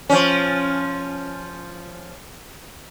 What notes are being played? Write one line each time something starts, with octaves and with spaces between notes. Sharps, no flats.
F3 C#4